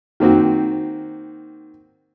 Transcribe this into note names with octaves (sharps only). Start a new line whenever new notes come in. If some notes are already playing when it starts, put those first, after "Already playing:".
D#3 A#3 C4 F#4